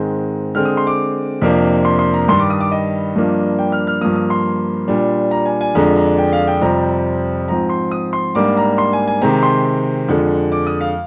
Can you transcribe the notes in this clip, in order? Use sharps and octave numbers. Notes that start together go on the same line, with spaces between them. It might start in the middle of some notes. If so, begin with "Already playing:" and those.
Already playing: G#2 D#3 G#3 C4
D3 G#3 C4 F6
D#6
C6
D6
F2 C3 F3 A#3 D4
C6
C6
A#5
G2 D#3 G3 C6
D6
D#6
D6
D#5
G2 F3 A#3 D4
G5
F6
F6
G2 F3 A#3 D#6
D#6
C6
A#2 G3 D4
A#5
G#5
G#5
F2 D3 G#3 D4 A#5
A#5
G5
F5
G5
F2 C3 G3 C4 A#5
G#2 F3 C4 A#5
C6
D#6
C6
G#2 G3 A#3 D4 D6
A#5
C6
G#5
G#5
C3 D#3 G#3 C4 A#5
C6
F2 D3 G#3
D6
D#6
F5